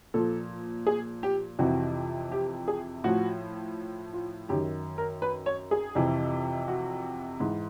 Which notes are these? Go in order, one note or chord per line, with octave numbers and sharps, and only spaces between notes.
A#2 F3 A4
G#4
G4
F2 C3 E3 F#4
G4
G#4
A2 F3 F#4
F4
F#2 D#3 G4
A#4
B4
C#5
G#4
F2 C3 E3
F#4
G#2 E3